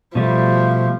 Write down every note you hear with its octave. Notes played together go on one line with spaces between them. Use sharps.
B2 F3 G3 A3